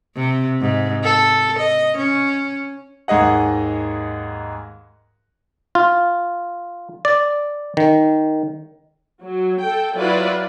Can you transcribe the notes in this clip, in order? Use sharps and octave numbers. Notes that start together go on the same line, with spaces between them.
C3
G#2
A4
D#5
C#4
D#2 G#2 G#4 D#5 F#5
F4
D5
D#3
F#3
A4 G5
F#3 E4 F4 B4 D5